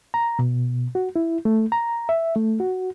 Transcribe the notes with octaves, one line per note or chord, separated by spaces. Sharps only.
A#5
B2
F#4
E4
A3
A#5
E5
A3
F#4